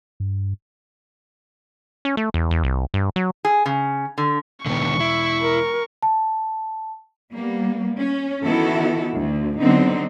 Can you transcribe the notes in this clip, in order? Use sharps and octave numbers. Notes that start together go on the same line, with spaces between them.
G2
C#4
A3
E2
E2
C2
G2
F#3
G#4
C#3
D3
E1 D3 D#3 B3 C#6
E4
A#4
A5
G3 A#3 B3
C#4
D#3 E3 B3 E4 F#4 A4
D2
D3 F#3 B3 C4 D#4